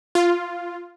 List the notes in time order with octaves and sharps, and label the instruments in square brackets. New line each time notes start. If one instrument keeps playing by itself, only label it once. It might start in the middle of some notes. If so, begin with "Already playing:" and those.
[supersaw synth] F4